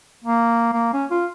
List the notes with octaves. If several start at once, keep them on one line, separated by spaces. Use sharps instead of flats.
A#3
A#3
C#4
F4